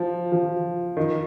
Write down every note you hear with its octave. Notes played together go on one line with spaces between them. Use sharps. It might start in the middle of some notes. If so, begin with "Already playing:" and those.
Already playing: F3
F3
D#3